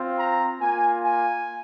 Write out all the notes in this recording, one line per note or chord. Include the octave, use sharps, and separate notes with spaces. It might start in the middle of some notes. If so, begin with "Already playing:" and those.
Already playing: C4 F4
A#5
A#3 F4 G#5
G#5